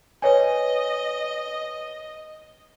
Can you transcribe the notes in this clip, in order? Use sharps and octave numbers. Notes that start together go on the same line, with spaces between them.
B4 C#5 D#5 G#5